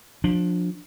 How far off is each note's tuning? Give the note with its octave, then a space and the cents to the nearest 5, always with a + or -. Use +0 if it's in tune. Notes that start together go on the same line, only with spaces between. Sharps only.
F3 +25 D4 +0